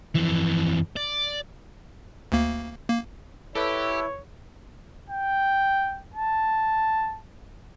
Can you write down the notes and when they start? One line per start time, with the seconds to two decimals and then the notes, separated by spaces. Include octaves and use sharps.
0.15 F2 E3
0.97 D5
2.32 D2 A#3
2.88 A#3
3.55 E4 G4 A4 B4 C#5
5.10 G5
6.14 A5